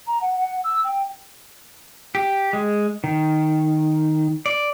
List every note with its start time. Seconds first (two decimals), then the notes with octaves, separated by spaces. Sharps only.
0.07 A#5
0.21 F#5
0.40 F#5
0.64 E6
0.84 G5
2.15 G4
2.53 G#3
3.04 D#3
4.46 D5